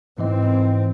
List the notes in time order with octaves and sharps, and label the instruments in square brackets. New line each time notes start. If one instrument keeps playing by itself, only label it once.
[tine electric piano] G#2 E3 D#5 [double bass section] C4